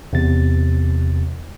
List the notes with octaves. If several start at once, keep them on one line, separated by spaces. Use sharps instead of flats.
E2 C3 A6